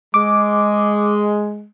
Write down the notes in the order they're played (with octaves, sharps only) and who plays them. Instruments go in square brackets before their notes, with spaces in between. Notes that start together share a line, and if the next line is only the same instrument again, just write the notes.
[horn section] G#3 [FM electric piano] D6